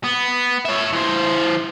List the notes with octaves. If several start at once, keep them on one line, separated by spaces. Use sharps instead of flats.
B3
C#5 E5
E3 C5